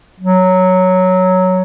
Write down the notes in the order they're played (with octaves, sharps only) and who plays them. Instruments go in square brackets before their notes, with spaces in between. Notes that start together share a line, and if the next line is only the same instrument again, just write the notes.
[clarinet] F#3